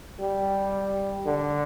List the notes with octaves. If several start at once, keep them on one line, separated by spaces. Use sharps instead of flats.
G3
D3